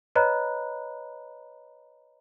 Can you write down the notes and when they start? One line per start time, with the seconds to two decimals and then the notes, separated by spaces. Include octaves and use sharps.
0.15 B4 C#5 D#5 A#5 B5 F#6